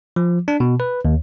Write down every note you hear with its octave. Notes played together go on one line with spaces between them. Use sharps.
F3
D4
B2
B4
D#2